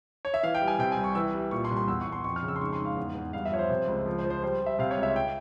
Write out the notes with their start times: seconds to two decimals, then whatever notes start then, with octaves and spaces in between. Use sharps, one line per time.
0.25 C#5
0.34 E5
0.43 E3 F5
0.55 G5
0.62 G3
0.68 G#5
0.79 C3 G5
0.92 G#5
0.97 C2
1.04 C#6
1.15 E3 E6
1.34 G3
1.51 A#2 C#6
1.65 C6
1.71 C2
1.77 C6
1.88 E2 E6
2.01 C#6
2.06 E2
2.12 C6
2.24 F2 C#6
2.36 F6
2.43 C#3
2.48 E6
2.56 C6
2.61 G#2 C#6
2.72 C6
2.79 G#2
2.85 F5
2.97 E2
3.15 E2
3.33 G2 F5
3.45 E5
3.51 F3 C#5
3.58 C5
3.70 C3 C5
3.88 C#2
4.06 F3
4.19 C5
4.24 F3
4.30 C5
4.42 G3 C5
4.61 G3 E5
4.79 C3 F5
4.91 C#5
4.97 C#2
5.03 E5
5.16 G5